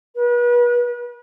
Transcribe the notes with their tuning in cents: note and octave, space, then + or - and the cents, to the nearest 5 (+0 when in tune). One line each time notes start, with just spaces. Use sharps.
B4 -40